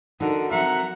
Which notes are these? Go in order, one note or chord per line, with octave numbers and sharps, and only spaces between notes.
D3 D#4 F#4 A#4
F#3 C4 A#4 E5 F#5 A#5